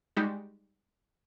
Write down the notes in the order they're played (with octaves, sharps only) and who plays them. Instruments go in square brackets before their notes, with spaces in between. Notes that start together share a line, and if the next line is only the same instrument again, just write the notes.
[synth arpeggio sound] G3 G#3 D#4 F#4 G4